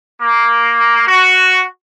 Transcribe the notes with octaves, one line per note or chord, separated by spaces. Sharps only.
A#3
F#4